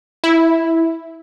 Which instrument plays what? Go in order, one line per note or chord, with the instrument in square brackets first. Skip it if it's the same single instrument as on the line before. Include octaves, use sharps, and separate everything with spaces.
[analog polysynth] E4